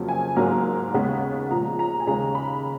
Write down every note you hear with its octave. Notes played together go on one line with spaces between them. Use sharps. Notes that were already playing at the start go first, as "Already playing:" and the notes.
Already playing: F2 C#3 F#3 A#3
G#5
G#2 F#3 A#3 A#5
D#2 C#3 G#3 B3
A#2 F3 G#3 A#5
A#5
G#5
D#2 C#3 G#3 A#5
B5